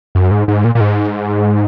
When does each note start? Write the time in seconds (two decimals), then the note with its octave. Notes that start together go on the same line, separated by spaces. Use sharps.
0.15 F#2
0.31 G#2
0.48 G#2
0.65 A#2
0.75 A#2
0.81 G#2